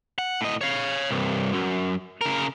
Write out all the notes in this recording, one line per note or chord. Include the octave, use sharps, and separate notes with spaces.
F#5
A2 D#5
C#5 F5
C2 G2
F#2
C#3 A#4